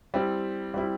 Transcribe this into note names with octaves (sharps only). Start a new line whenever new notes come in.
G3 C4 E4
G3 C4 E4